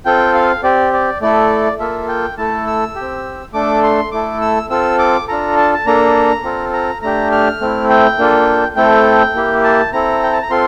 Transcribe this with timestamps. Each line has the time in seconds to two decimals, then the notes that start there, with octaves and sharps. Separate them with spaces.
0.05 C4 F4 A4 G5
0.35 F5
0.63 C4 G4 D5
0.93 D5
1.21 A3 E4 A4 D5
1.80 A#3 F4 A4 E5
2.08 G5
2.38 A3 E4 A4 A5
2.67 E6
2.96 G4
3.01 C4
3.53 A3 D4 A4 D6
3.83 C6
4.11 A3 E4 A4 D6
4.41 E6
4.70 C4 F4 A4 E6
4.99 D6
5.28 D4 F4 A4 A#5
5.57 A5
5.74 A5
5.86 A#3 D4 A4 A#5
6.44 C4 F4 A4
6.73 A#5
7.02 A3 D4 G4 A#5
7.32 F6
7.60 A3 C4 E4
7.89 G5
8.18 A#3 D4 F4 A4
8.76 A3 C4 E4 A4 G5
9.35 A#3 E4 G4
9.64 A5
9.93 C4 E4 A4 A#5
10.23 G5
10.33 A5
10.42 A#5
10.50 C4 F4 A4 C6